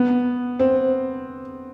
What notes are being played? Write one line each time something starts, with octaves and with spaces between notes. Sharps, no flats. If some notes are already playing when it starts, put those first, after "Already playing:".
Already playing: B3
C4